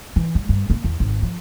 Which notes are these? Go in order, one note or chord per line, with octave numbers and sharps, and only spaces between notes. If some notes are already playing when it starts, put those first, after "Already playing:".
E3
G#3
G2
A#3
E2
G#1
F3